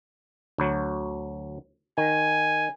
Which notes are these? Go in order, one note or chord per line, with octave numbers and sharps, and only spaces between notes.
D2 F#3
D#3 G#5